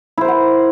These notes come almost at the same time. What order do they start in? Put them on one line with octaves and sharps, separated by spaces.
E4 C5 A#4 F#5